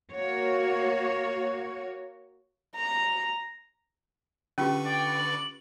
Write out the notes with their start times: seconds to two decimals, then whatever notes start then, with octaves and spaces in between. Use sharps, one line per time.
0.11 A#3 F#4 C#5
2.76 A#5
4.58 D3 C#4 F4 G4 B4 C#6
4.85 D5 G5
5.18 F#7